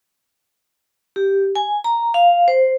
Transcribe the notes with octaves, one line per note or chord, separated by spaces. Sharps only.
G4
G#5
A#5
F5
C5